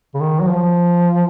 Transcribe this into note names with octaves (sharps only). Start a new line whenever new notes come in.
C#3
D#3
F#3
F3